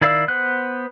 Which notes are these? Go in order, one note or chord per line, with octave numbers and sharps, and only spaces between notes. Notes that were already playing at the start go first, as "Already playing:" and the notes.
D#3 E4 D5 F5 E6
B3 C5 F#6